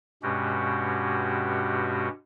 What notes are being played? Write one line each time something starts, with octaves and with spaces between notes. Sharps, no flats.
G2 B2 G#3 C#4 F#4 G4